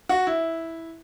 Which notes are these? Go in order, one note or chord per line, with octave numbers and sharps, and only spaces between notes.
F#4
E4